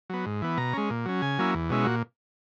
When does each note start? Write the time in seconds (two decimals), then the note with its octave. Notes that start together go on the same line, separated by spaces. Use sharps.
0.10 F#3 B3
0.26 G#2
0.42 E3 B3
0.57 B2 A#5
0.73 G#3 C#4
0.90 A#2
1.05 F#3 C#4
1.22 C#3 G#5
1.39 F#3 A#3 C#4 E4
1.55 E2
1.70 B2 G#3 C#4 E4
1.84 A#2 F#4